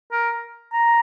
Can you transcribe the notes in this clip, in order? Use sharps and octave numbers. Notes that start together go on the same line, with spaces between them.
A#4
A#5